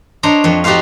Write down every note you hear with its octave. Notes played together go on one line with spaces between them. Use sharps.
D4 C5 C#5 D#5 A#5
F2 C#5
D#4 F#4 G4 A4 C5 F5